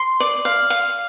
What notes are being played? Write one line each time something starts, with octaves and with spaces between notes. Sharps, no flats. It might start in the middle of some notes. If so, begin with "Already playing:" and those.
Already playing: C6
D5
F5
F5